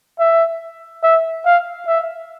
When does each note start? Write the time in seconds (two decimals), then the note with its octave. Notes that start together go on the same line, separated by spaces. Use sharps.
0.19 E5
1.03 E5
1.45 F5
1.87 E5